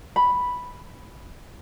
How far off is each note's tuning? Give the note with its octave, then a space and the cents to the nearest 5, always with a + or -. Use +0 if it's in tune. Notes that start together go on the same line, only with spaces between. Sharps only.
B5 +0